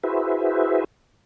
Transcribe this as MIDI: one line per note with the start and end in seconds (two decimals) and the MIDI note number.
0.04 0.84 64
0.04 0.84 66
0.04 0.84 68
0.04 0.84 71
0.04 0.84 72
0.04 0.84 76